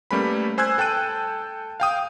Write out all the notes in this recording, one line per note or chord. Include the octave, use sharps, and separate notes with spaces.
G3 A3 A#3 C#4 B4 B5
C5 G#5 E6 F#6 G#6
A4 G5 A5 F#6 D#7
F5 G5 D#6